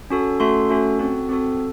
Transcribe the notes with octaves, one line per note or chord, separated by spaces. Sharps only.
C#4 F#4 A4
A3 C#4 F#4 A4 C6
A3 C#4 F#4 A4
C4 F#4 A4
C4 F#4 A4